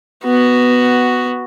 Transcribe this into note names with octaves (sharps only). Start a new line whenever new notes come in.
B3 F#4